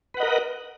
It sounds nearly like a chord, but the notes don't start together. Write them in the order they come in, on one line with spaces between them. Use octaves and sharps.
B4 F#5 D#5 A#4